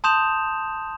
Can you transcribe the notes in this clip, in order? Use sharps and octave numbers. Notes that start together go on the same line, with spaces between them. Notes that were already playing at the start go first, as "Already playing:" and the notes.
A5 C6 D#6 G6 E7 F7